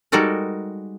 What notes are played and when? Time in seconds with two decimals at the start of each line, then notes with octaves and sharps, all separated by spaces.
0.12 G3 G#3 D#4 F#4 A4 A#4